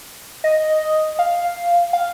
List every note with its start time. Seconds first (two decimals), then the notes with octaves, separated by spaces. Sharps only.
0.44 D#5
1.19 F5
1.93 F5